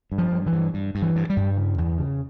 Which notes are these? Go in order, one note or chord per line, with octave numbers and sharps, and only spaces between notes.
G2
F3
G2
E3
G2
G2
G2
E3
G2
G3
G2
C#3
E2
C#3